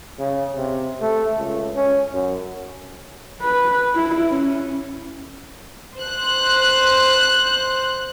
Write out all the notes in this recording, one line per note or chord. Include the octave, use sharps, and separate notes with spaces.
C#3
C3
A3
C#2
C#4
F#2
B4
E4
C#4
C5 F#6